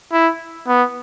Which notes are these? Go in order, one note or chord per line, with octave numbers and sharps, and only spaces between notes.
E4
B3